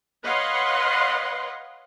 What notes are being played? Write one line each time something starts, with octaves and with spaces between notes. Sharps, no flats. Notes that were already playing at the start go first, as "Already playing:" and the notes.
B4 C#5 D#5 F5 F#5 C6